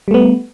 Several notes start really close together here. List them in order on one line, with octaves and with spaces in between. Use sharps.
G3 A3 B3